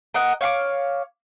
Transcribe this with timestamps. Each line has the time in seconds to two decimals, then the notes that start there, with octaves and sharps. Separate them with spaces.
0.14 A#4 D#5 F#5
0.41 C#5 F5 C6 D6